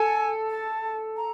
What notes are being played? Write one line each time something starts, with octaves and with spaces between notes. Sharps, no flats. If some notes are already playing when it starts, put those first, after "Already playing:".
Already playing: A4 G#5
A5
A#5